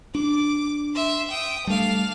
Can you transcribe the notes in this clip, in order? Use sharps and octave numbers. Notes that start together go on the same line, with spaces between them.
D4 D6
E5 C6
G5 D#6
G3 A3 D4 F5